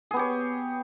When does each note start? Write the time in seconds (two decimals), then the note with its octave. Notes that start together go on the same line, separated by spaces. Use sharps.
0.11 G#4
0.14 B3
0.16 G4
0.19 C#5